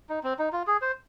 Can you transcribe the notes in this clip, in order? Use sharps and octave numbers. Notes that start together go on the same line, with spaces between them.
D#4
C4
D#4
F4
G#4
C5